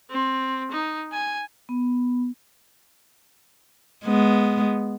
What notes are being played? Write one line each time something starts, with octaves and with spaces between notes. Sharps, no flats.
C4
D#4
G#5
B3
G#3 B3